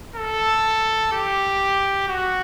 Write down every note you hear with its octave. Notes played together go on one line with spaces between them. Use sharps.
A4
G4
F#4